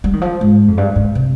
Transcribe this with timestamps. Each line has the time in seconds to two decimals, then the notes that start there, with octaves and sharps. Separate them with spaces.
0.04 G3
0.13 D#3
0.22 F3
0.41 G#2
0.68 F2
0.78 G2
0.96 G#2
1.15 C3